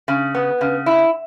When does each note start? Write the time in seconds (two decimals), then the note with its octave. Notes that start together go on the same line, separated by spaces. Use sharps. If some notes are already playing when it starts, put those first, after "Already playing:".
0.08 C#3
0.35 B3
0.61 C#3
0.86 E4